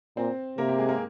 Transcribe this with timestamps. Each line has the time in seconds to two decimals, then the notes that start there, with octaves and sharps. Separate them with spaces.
0.17 A#2 C4 C5
0.58 C3 A#3 A#4
0.68 G4
0.78 G#3 G#4
0.89 A#3 A#4